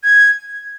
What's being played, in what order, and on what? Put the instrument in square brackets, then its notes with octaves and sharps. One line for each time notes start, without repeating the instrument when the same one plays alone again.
[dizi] G#6